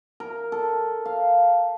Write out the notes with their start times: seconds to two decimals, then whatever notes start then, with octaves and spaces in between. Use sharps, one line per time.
0.20 A#4
0.52 A4
1.05 F5